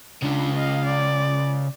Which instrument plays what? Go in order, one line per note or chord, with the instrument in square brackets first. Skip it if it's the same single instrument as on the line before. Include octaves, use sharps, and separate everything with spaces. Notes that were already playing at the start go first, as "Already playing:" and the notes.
[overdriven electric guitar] C#3 F4 [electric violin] D4
[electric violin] D#5 F5
D5